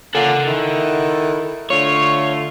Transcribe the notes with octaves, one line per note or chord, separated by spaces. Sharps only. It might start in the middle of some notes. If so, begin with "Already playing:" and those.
A#3 C#4 F4 A4 F#5
D#3 E4
D3 A3 F4 C#5